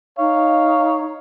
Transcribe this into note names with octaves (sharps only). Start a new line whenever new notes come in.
D#4 C#5 F5